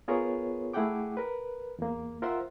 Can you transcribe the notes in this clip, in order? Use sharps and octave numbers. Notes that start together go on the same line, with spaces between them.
B3 F4 G#4 A#4 B4 C#5
A3 E4 G#4 F#5 G5 D6
A#4 B4
E2 A#3
F4 A#4 C5 E5 F#5 C6